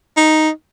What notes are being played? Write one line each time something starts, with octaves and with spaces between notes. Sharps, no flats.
D#4